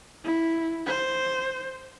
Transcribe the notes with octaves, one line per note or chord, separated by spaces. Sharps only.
E4
C5